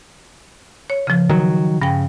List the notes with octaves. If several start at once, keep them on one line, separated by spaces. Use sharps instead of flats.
C#5
C#3 F3
D#3 F#3
G2 C#3 G5